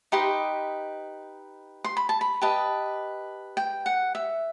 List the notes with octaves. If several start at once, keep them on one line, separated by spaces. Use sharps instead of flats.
D#4 G4 B4 D#5 C6
C6
B5
A5
B5
G4 B4 D#5 A5
G5
F#5
E5